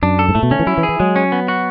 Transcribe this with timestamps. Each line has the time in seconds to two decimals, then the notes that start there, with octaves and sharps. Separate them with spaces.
0.02 F#2 D4
0.19 A4
0.29 G#2
0.35 A2 A3
0.43 B2
0.51 D3 C#4
0.59 E3
0.67 F#3 E4
0.78 E3
0.83 G#4
0.89 E3
1.00 F#3 G#3
1.16 C#4
1.32 B3
1.48 F#4